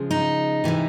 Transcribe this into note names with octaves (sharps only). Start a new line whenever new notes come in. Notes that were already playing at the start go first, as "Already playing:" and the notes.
Already playing: C#3 F3 G#3
D#4
C3 E3 G#3